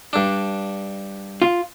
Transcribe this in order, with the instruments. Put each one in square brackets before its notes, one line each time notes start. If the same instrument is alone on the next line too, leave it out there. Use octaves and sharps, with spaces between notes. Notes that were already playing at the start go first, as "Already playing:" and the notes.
[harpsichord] G2 D4
[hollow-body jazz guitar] F4